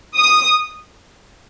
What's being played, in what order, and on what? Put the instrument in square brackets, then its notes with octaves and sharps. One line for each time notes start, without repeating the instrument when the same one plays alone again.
[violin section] D#6